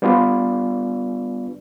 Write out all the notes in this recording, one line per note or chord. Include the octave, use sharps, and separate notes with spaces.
G3 B3 D4 F4 B4 D5